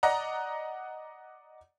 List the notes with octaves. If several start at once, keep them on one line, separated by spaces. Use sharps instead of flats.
D5 D#5 F#5 A#5